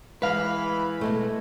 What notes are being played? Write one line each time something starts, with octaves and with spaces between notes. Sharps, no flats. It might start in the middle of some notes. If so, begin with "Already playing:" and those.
E3 G#3 B4 F5 B5
B2 G#3 A3